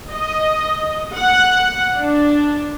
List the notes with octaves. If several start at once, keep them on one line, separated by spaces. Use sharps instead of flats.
D#5
F#5
D4